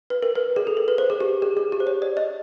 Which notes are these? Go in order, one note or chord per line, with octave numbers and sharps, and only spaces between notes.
B4
A#4
B4
G#4
A4
A#4
B4
C5
G#4
G4
G#4
G#4
G4
C5
C#5
D5
D#5